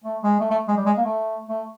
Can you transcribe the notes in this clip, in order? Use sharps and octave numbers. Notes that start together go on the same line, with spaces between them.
A3
G#3
A3
A3
G#3
G3
G#3
A#3
A3
A3